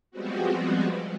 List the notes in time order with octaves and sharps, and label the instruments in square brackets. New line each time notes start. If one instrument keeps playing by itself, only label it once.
[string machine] F3 G3 G#3 B3 C4 F#4